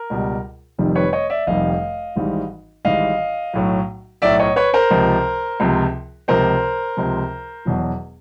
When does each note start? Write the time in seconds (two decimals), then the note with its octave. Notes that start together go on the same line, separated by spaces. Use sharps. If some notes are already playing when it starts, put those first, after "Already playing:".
Already playing: A#4
0.10 C#2 B2 G3
0.78 F1 F2 C3 D#3 G3
0.95 B4 C#5
1.13 C#5 D#5
1.30 D5 E5
1.47 F1 F2 C3 D#3 G3 D#5 F5
2.16 G#1 G#2 E3 G3
2.85 G#1 G#2 E3 G3 D#5 F5
3.53 B1 A2 F#3
4.22 B1 A2 F#3 D5 E5
4.39 C#5 D#5
4.56 B4 C#5
4.73 A#4 C5
4.91 C#2 C3 F3
5.60 C#2 C3 F3
6.28 C#2 C3 F3 A#4 C5
6.97 C#2 C3 F3
7.65 E1 E2 B2 F#3